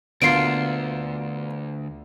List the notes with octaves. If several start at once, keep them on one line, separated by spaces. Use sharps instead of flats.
D2 B2 D3 A#3 F4 C7 D7